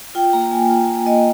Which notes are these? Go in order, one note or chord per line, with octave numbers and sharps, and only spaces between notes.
F4 G5
A#3 A#5
A#3 G#5
F4
F4
A#3 D#5